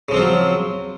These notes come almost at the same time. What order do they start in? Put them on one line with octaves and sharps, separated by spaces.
C#3 F3 C4 F4 F#3